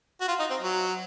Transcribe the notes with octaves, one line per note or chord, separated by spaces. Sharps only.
F#4
F4
D#4
C4
F#3